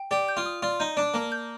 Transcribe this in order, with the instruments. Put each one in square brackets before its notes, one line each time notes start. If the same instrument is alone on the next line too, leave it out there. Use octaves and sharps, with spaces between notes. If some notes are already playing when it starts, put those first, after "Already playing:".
Already playing: [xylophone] G5
[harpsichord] G4 [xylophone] D5
[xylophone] G6
[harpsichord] F4
[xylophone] D#6
[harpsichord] F4 [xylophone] D5
[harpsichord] D#4 [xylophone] G6
[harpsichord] D4 [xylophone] D5
[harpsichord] A#3 [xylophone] A5
[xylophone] G6